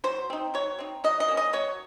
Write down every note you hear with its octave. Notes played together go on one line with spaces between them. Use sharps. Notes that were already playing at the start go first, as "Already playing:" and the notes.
F#3 C5
C4 D#4
F#3 C#5
C4 D#4
F#3 D#5
D#5
A#3 C#4
D#5
F#3 C#5